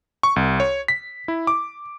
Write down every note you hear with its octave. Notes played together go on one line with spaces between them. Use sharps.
C#6
C2
C#5
B6
E4
D6